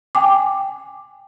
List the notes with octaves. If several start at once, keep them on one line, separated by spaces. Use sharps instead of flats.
G5 G#5 D6